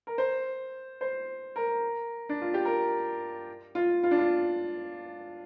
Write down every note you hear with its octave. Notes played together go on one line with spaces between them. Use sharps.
A#4
C5
C5
A#4
D4
F4
G4
A#4
F4
F4
D4
F4